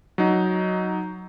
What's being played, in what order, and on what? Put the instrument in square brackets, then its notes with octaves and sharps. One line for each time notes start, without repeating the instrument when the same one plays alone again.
[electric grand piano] F#3 D#4